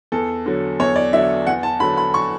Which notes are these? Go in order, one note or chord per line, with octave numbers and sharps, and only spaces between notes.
E2 A4
D3 F#3
E2 C#5
D5
D3 F#3 E5
E2 F#5
A5
D3 F#3 B5
B5
C#6